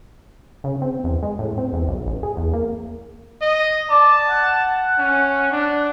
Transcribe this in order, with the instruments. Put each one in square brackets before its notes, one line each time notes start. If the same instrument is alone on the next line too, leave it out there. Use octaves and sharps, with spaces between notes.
[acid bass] C#3
C4
E2
G#3
A2
C4
E2
B1
A1
G#4
E2
A#3
[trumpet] D#5
[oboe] D5 [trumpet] A5
[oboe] F#5
[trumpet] C#4
D4